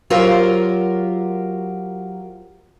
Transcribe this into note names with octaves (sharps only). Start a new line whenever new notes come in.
F#3 F4 G4 A#4 C5